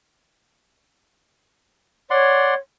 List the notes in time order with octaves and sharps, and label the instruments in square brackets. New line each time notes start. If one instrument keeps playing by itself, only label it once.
[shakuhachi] C#5 [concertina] D5 F#5 C6